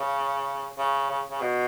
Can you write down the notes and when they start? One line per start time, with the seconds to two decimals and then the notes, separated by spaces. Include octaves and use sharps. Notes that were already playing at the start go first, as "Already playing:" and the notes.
Already playing: C#3
0.78 C#3
1.10 C#3
1.31 C#3
1.41 B2